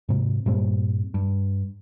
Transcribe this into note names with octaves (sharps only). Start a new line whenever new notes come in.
G#2 C3
G2 A#2 G3 C4
G2